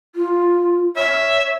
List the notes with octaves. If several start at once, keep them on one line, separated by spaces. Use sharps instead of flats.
F4
C#5 E5